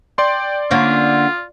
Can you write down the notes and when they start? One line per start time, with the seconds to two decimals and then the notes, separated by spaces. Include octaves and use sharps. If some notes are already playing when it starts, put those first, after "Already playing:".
0.18 D5 G5 C6
0.71 D3 A#3 C#4 F4